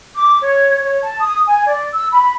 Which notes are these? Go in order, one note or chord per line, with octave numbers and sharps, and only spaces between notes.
D6
C#5
C#5
A5
D#6
G#5
D5
E6
B5